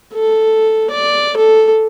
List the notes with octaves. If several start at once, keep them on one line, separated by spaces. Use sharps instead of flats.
A4
D5
A4